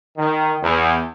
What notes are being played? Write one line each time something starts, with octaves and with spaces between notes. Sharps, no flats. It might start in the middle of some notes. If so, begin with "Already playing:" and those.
D#3
E2